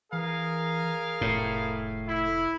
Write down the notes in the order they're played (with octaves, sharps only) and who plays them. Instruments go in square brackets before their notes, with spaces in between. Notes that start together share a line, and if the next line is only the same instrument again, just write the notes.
[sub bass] E3 [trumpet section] G#4 A#4 F5
[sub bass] F1 [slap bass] A2
[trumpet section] E4